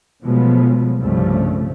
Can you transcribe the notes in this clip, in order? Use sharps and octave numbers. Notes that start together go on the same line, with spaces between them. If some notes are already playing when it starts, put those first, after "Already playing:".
B2 F3 F#3 G#3 A3 B3
C2 G2 C#3 F3 A3